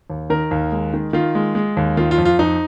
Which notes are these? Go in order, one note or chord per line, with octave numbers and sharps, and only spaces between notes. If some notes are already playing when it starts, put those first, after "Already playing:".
D#2
D#3 A#4
D#2
G#3
D#3
D#3 F4
G#3
G#3
D#2
D#3 F4
F4
F2
F4
F2 D#4